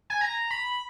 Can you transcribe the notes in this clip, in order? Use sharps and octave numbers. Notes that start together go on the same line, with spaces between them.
G#5
A#5
B5